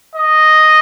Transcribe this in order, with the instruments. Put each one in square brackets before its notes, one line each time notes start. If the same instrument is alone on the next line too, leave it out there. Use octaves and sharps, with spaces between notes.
[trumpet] D#5